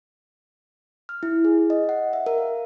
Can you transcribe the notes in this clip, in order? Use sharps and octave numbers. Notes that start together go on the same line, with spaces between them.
F6
E4
G#4
D#5
F#5
E5
A#4
F5